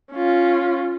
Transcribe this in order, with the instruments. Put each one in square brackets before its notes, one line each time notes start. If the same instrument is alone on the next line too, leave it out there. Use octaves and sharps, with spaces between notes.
[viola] C#4 F4